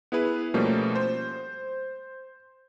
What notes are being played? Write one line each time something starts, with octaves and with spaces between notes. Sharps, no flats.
B3 E4 G#4 B4
B2 F3 G3 A3 A#3 C#4
C5